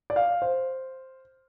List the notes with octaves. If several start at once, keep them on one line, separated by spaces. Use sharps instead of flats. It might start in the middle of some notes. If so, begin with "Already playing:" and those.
D5
F5
C5